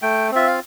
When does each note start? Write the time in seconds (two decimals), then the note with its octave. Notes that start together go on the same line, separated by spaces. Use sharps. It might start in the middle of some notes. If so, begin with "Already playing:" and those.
0.02 A3 G5
0.31 C4 F4 E5
0.47 F5